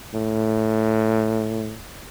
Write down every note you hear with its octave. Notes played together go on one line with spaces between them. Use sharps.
A2